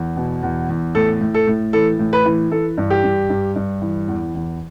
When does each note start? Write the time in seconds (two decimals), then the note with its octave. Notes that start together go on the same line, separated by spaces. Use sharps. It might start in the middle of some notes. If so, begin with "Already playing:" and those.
Already playing: E2
0.17 B2
0.43 E2
0.69 E2
0.95 A2 A4
1.21 A2
1.34 A4
1.47 A2
1.73 E3 A4
1.99 A2
2.13 B4
2.26 E3
2.52 E3 A4
2.78 G2
2.90 G4
3.04 G2
3.30 G2
3.56 G2
3.82 E3
4.08 E2
4.35 E2